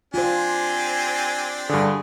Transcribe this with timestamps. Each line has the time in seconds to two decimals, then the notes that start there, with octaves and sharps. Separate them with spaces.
0.14 C4 D4 F4 G4 C5 G#5
1.69 G2 D3 G#4